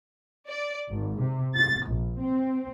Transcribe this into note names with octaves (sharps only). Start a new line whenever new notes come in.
D5
G#1
C3
A6
A#1
C4